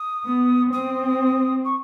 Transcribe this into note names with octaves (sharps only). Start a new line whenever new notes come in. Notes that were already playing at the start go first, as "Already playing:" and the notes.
Already playing: D#6
B3
C4 D#6
C#6